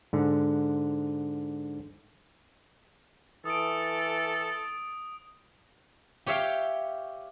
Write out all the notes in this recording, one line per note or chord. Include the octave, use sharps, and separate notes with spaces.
G#2 D3
E3 A4 D#6 D7
G4 C#5 E5 F5 G5